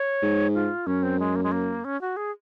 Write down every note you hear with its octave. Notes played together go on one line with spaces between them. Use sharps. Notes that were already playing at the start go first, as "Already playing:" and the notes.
Already playing: C#5
G#2
F4
F#2 C#4
C4
G#3
A#3
G#3
A#3
C#4
F#4
G#4